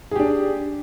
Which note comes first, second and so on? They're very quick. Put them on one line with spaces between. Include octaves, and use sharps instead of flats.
G#4 G4 D4